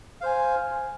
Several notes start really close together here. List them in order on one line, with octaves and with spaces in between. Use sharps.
F5 C5 G#5